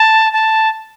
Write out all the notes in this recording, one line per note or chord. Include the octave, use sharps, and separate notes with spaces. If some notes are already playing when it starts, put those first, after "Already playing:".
Already playing: A5
A5